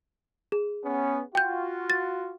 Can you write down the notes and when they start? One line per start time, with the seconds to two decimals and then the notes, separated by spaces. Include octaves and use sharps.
0.52 G#4
0.85 B3 C#4
1.35 F4 F#4 G5 G6
1.90 A6